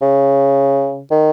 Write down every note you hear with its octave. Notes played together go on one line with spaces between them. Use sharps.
C#3
D#3